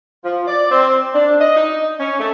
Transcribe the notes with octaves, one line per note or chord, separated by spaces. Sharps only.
F3
D5
C4
D4
D#5
D#4
C#4
A3